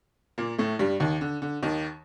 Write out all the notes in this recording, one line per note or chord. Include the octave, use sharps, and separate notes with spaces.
A#2 A#3
A2 A3
G2 G3
D#2 D#3
D3
D3
D#2 D#3